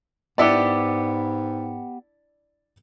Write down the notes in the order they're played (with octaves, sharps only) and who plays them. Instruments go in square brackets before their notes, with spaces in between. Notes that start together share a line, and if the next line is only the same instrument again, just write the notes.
[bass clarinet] G#2 [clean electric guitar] B3 G4 [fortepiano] D4 E4 D5